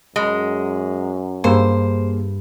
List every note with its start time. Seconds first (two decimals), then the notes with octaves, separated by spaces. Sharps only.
0.16 F#2 G#3
1.44 G2 A#3 G#4 C5 E6 E7